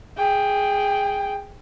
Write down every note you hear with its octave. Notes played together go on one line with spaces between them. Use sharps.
G#4 G5